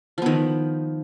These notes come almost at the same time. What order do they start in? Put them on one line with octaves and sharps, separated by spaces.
F3 B3 D#3